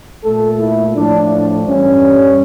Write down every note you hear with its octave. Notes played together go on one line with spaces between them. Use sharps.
A#2 A3 A4
E4
A2 F3 A3 D4
D4
G2 E3 G3 C#4